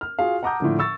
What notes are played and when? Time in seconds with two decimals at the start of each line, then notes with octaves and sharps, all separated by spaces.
0.01 F6
0.19 F4 F#4 G#4 F5
0.43 F#5 A5 A#5 D6 D#6 G6
0.60 A2 D3 F3
0.79 C#6 E6 A6